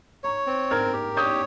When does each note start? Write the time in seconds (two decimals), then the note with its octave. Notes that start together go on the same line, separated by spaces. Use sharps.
0.24 C#5 A#5 C#6
0.47 C4
0.71 A#4 F6 G#6
0.93 G4
1.17 C#5 D#6 G6